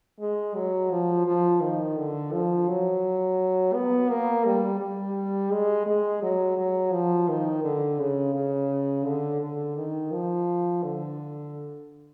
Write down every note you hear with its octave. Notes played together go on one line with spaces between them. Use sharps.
G#3
F#3
F3
F3
D#3
D3
F3
F#3
B3
A#3
G3
G3
G#3
G#3
F#3
F#3
F3
D#3
D3
C#3
C#3
D3
D3
D#3
F3
D3